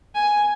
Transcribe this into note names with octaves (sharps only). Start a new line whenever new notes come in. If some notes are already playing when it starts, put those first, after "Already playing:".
G#5